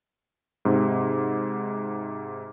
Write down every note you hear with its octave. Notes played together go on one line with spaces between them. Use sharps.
G#2 C3